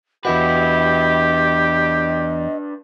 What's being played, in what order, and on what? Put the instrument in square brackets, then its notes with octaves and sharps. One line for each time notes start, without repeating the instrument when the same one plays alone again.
[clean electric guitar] E2 E4 F#4 [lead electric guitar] D4 B4 [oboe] G4 [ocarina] D#5